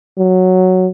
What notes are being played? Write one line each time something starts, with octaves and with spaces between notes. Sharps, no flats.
F#3